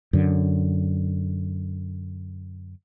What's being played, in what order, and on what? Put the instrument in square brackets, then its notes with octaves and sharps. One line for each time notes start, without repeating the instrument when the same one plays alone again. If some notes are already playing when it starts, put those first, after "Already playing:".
[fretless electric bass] F#2 D3